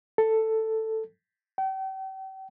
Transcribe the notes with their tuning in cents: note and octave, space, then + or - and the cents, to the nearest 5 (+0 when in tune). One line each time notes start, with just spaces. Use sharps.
A4 +10
G5 -40